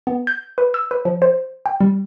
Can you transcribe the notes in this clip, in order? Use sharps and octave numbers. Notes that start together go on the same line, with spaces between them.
B3
G6
B4
E6
B4
F3
C5
G5
G3